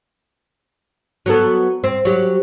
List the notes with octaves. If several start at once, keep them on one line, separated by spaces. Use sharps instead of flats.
F#3 B3 A4
C4
F#3 G4